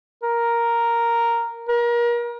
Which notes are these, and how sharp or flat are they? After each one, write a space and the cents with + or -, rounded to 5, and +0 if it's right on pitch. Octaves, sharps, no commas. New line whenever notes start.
A#4 +0
A#4 +35